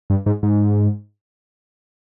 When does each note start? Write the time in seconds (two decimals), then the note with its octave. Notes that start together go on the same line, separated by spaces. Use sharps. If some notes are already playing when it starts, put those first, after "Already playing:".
0.10 G2
0.26 G#2
0.43 G#2